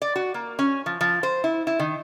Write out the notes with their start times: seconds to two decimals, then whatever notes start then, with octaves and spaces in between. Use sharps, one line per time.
0.02 D5
0.16 F#4
0.34 A#3
0.59 C#4
0.86 F3
1.01 F3
1.23 C5
1.44 E4
1.67 E4
1.79 D#3